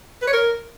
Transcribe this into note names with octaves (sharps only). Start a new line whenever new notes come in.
B4
C#5
A#4